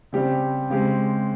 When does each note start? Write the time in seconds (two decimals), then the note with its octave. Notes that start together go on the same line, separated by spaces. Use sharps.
0.13 C#3 G3 C4 G4
0.70 C#3 G#3 C4 G4